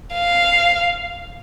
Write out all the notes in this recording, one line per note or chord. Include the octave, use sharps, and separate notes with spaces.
F5